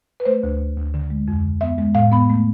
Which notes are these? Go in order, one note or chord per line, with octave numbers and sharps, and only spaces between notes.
B4
A3 C5
D2
D2
D2
D3
G#3
F2
D3
B3 E5
G#3
A2 F5
B3 B5
A3